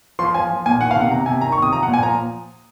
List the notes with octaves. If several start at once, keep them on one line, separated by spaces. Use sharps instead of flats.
F3 C6
F3 G#5
F3
A#2 G#5
D#3 F#5
F5
C3 F#5
C3 A#5
C3 G#5
D#3 A#5
C#6
C3 D#6
F3 A#5
F#5
A#2
G#5
F3 A#5